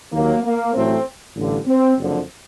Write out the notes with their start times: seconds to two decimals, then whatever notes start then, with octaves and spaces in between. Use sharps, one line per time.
0.13 D#2 D#3 F#3 A#3
0.44 A#3
0.74 A1 A2 F#3 A3 C4
1.36 A1 G2 D3
1.66 C4
1.97 F#1 F2 D3 F3